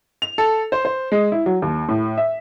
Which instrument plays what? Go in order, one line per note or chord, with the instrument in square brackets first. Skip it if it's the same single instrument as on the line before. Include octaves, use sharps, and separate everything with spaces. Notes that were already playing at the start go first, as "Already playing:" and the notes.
[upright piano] F7
A4
C5
C5
G#3
E4
F#3
D#2
A2
E5